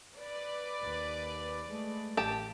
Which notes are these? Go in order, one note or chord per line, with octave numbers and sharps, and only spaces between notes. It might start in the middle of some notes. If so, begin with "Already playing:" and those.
B4 D5
D#2
G#3 A3
A1 G4 A5